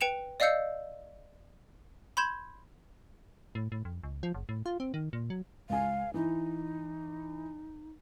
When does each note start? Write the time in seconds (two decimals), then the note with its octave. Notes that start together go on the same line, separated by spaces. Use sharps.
0.01 B4 G5 C#7 E7 F7
0.40 D5 D#5 F5 E6 G6 C#7
2.17 B5 C6 G6 G#6 E7
3.55 A2
3.72 A2
3.85 F2
4.03 C#2
4.23 F3
4.34 F#1
4.49 A2
4.66 F4
4.80 C4
4.94 D#3
5.13 A#2
5.30 F#3
5.69 C#2 F5 G#5
6.14 E3 D#4